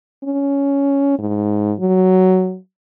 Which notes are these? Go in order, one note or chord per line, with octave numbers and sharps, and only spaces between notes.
C#4
G#2
F#3